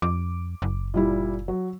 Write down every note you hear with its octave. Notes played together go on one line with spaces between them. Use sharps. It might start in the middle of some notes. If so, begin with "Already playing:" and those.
F2 D6
F#1
A#2 G3 E4
F#3